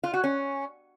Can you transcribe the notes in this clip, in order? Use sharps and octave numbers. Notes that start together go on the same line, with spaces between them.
F4
F#4
C#4